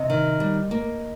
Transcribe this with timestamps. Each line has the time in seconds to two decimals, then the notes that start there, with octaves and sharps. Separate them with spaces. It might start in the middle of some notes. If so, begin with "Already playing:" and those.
Already playing: C3 D#5
0.10 D#3
0.40 G3
0.71 A#3